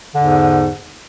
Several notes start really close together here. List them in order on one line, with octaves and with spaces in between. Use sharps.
D3 E2 G#2